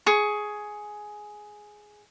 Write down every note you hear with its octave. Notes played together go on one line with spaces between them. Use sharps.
G#4 C#6